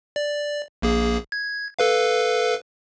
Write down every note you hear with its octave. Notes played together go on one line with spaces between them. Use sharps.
D5
A#1 A#3 G#4
G#6
A4 B4 F5